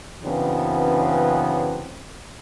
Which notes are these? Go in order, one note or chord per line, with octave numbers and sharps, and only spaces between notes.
F#2 C#3 E3 B3 C4 D4